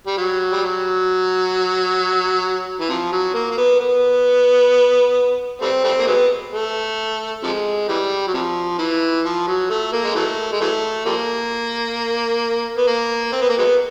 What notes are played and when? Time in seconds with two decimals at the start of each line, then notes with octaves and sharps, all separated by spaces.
0.07 G3
0.17 F#3
0.52 G3
0.63 F#3
2.80 E3
2.89 C3 F3
3.12 F#3
3.34 A#3
3.51 A#3
3.58 B3
3.80 B3
5.62 G3 A3 C4
5.84 G3 A3 C4
5.99 A#3
6.07 F#3 G#3 B3
6.52 A3
7.43 C3 F3 G#3
7.89 E3 G3
8.27 F#3
8.34 C3 F3
8.79 E3
9.25 F3
9.47 F#3
9.70 A3
9.93 A#3
10.04 G#3
10.15 E3 F#3 A3
10.53 G#3
10.61 E3 F#3 A3
11.06 F3 G3 A#3
12.77 B3
12.87 A#3
13.33 C4
13.42 B3
13.49 A#3
13.58 F#3 G#3 B3